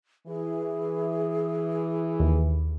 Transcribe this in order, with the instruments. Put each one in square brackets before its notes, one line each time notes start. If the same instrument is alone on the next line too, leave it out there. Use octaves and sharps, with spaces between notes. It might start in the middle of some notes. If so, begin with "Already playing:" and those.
[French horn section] E3 [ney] G#4
[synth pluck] D#2